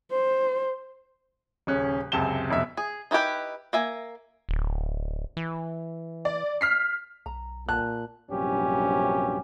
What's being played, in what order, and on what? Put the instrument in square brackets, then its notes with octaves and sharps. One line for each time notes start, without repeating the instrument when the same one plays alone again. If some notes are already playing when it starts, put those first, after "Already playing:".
[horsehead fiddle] C5
[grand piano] D#1 C#3 C#4 F#6
C#2 F#2 C3 A5 E7 G7
F1 B2 E5
[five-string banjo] G#4
D#4 E4 F#4 G4 B4
A#3 E5 G#5
[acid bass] D1
E3
[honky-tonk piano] D5
F6 B6 C7
[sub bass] B1 [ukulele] A#5
[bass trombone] A#2 [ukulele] A5 [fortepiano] F#6
[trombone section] A#1 G2 C3 F#3 C#4 G4